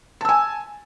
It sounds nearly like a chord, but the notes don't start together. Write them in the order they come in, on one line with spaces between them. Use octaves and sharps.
A5 E6 G#5